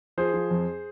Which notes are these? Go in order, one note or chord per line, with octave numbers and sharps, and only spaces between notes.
F3 G#4 C5
F3
F2